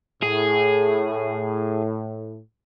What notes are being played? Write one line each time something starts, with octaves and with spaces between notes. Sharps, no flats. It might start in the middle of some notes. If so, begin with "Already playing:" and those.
A2 G#4